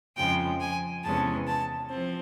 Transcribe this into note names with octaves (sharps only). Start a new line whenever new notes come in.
F2 C#3 F3 G#3 G5
G#5
E2 C3 E3 G#3 C#4 A5
A5
F3 C4